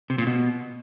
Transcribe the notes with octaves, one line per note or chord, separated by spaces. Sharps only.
C3
A#2
B2